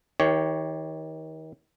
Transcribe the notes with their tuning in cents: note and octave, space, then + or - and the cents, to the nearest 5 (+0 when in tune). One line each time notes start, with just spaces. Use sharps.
D#3 +35 G4 +0 C#5 +0